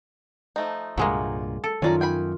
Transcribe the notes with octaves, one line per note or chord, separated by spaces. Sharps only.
F3 A3 D#4
C2 G2 A#2 F#3 G#3 A#3
A4
F#2 D#3 C#4 F4 D5 A#5
G5 G#5 B5